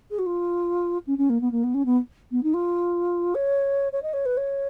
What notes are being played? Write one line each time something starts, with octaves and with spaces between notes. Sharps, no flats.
G#4
F#4
F4
C#4
C#4
A#3
B3
A#3
B3
C#4
B3
B3
D#4
F4
C#5
C#5
D#5
C#5
B4
C#5